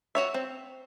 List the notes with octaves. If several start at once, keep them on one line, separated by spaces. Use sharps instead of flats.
F#4 C#5 E5
C4